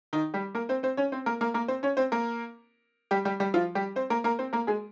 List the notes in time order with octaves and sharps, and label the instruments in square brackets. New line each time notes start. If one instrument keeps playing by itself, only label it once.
[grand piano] D#3 D#4
G3 G4
A#3 A#4
C4 C5
C4 C5
C#4 C#5
C4 C5
A#3 A#4
A#3 A#4
A#3 A#4
C4 C5
C#4 C#5
C4 C5
A#3 A#4
G3 G4
G3 G4
G3 G4
F3 F4
G3 G4
C4 C5
A#3 A#4
A#3 A#4
C4 C5
A#3 A#4
G#3 G#4